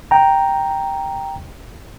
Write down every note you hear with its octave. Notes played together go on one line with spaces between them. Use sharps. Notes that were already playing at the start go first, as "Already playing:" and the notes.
G5 A#5